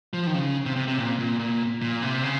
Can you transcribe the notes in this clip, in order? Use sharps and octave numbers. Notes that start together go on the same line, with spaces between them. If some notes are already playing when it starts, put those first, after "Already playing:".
F3
D#3
C#3
C3
C3
C3
A#2
A#2
A#2
A#2
C3
C#3